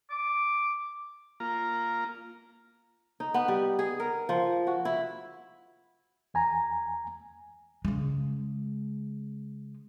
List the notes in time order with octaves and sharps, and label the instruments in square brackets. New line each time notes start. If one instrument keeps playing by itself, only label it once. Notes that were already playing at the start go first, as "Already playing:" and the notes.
[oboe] D6
[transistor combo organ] A#3 F4 A#5
[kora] D#4
B3
G3
G#4
A#4
F3
F#4
E4
[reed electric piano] E2 G#5 A#5
[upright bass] C#3 G#3